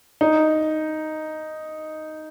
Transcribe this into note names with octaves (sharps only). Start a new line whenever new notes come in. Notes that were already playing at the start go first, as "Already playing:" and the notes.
D#4